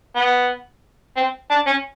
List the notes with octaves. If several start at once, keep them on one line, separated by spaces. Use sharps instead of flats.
B3
C4
D4
C#4